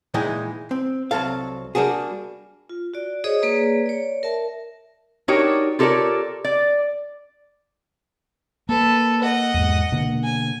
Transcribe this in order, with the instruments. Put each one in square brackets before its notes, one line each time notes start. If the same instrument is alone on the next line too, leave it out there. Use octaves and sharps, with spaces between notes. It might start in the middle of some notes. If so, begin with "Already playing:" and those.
[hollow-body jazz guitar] A#2 E3 G#3 D#4 E4 G5
C4
C2 F#3 C4 A4 F5
G3 A#3 D4 F#4 G#4
[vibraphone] F4
F#4 D5
G#4 C5 C#5 D#5 D#6
A#3 G#4 B4 C#5 D5 A#5
C#5 D5
A#4 E5 A5
[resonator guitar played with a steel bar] D4 D#4 F#4 G4 A#4 C#5
F4 G4 A4 A#4 C#5 D5
D5
[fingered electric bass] A#3 [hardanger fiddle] A4 B4
[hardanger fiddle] D#5 F#5
[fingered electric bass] E2 G#2
B2 D3 A#3
[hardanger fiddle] G#5